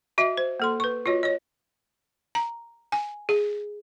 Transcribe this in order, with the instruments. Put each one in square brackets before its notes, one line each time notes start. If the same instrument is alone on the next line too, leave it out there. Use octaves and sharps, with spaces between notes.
[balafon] F#4 D#5 E5
C5
A#3 A4 C6
B4 C#6
F4 F#4 C#5 D#5
C#5 D#5
A#5
G#5
G#4